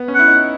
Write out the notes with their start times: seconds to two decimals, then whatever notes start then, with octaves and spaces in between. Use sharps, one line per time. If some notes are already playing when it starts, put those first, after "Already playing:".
Already playing: B3
0.08 C#4
0.15 E4 F#5
0.27 D#4